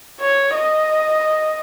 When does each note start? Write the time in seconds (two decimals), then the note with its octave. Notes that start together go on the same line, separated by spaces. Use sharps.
0.20 C#5
0.55 D#5